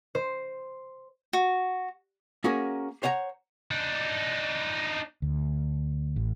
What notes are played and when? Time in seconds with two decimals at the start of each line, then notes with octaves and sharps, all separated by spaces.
0.15 C5
1.33 F#4
2.44 A#3 C#4 F#4 G#4 A#4
3.03 C5 C#5 F#5 G#5 A#5
3.71 D4 D#4
5.22 D2
6.16 A1